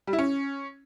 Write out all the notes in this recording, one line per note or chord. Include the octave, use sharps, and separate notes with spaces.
G3
E4
C#4